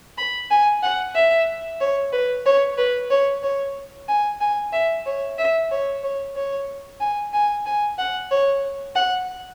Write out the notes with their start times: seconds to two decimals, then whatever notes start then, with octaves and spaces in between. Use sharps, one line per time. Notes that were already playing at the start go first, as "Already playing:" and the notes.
0.18 B5
0.50 G#5
0.83 F#5
1.15 E5
1.80 C#5
2.12 B4
2.45 C#5
2.78 B4
3.11 C#5
3.43 C#5
4.08 G#5
4.40 G#5
4.73 E5
5.06 C#5
5.38 E5
5.71 C#5
6.03 C#5
6.36 C#5
7.00 G#5
7.33 G#5
7.66 G#5
7.98 F#5
8.31 C#5
8.95 F#5